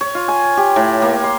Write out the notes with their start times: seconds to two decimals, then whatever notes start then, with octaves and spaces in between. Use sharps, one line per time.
0.01 C#5
0.15 F4
0.28 G#5
0.57 G4
0.76 A2
1.02 A#3
1.24 C6